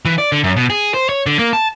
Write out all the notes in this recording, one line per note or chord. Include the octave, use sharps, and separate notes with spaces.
E3
D5
D3
F#2
B2
G#4
C5
C#5
D3
A#3
A5